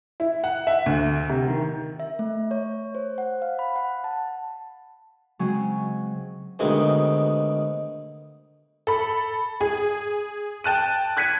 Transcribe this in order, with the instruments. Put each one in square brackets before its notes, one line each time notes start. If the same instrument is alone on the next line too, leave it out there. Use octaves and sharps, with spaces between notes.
[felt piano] E4
F#5
E5
D2
C3
D#3
[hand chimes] E5
A3
C#5
C5
F#5
F5
B5
F#5
A5
[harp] C#3 F#3 G#3 C4 C#4
[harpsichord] D2 B2 D#3 G#3 C4 G#5
[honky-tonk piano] A4 B5
G#4 G#5
G5 A5 F#6 D#7
F#6 G#6 B6 C#7 D#7